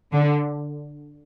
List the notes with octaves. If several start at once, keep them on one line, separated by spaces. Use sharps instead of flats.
D3